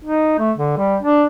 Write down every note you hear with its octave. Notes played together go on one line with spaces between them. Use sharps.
D#4
A3
D3
G3
D4